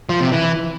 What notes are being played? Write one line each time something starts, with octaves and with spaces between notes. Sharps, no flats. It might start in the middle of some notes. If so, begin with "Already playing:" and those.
F3
C3
E3